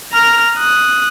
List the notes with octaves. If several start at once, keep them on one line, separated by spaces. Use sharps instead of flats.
A#5 F6
D#6 F#6